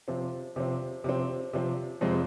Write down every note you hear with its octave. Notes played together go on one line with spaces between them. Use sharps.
C3 F3 C4
C3 F3 C4
C3 F3 C4
C3 F3 C4
F2 C3 F3 G#3 C4